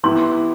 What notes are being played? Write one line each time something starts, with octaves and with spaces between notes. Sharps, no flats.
E3 B3 E4 G4 C6